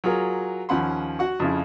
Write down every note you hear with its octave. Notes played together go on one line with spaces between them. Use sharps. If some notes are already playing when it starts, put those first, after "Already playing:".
F#3 F4 G#4 A#4
D#2 F3 C#4 F#5 B5 C6
F#4 F#5 C#6
F2 C#3 F3 E4 G#4